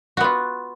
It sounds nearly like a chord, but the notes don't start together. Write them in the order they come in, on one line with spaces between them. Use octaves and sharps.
F#4 B3 F4